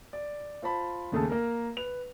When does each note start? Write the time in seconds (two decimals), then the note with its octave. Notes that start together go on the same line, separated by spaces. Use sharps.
0.13 D5
0.62 F4 C5 A5 B5
1.12 D#2 C#3 A3 G#4 A4 A5
1.29 A#3 A#4
1.77 B4 F7